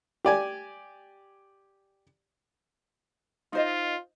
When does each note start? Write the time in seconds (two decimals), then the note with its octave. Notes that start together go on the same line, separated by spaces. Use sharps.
0.25 G4 D5 G#5
3.53 D#4 F4 C5 D#5